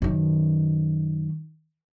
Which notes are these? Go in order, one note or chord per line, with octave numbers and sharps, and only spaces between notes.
F#2 D#3